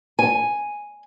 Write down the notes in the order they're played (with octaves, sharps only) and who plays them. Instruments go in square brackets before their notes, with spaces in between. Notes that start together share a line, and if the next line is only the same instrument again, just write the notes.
[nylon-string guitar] G#5